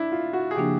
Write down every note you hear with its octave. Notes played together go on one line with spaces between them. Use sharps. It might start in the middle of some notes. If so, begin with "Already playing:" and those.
Already playing: D4 E4
F4
F#4
G#4
C#3 F3 A#3 D4 G4